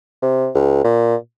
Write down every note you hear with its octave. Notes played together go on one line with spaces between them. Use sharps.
C3
C#2
A#2